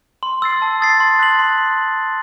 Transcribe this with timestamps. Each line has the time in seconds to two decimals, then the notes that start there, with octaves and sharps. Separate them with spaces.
0.23 C6
0.42 E6 A6 C7
0.62 A5
0.81 D#6 A6 C7
1.00 C6
1.19 F#6 B6 F#7
1.39 C6